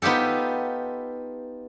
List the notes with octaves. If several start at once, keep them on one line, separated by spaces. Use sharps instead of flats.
B3 D#4 F4 G4 A4